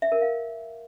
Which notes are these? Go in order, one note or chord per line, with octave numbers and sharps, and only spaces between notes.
E5
A#4
F5